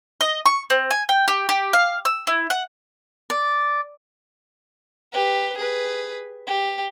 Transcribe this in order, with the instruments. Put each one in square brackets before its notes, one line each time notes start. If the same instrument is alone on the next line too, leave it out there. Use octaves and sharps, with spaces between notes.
[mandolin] D#5
C#6
C4
G#5
G5
G4
G4
F5
E6
E4
F#5
[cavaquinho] D5
[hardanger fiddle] G4 B4
G#4 B4
G4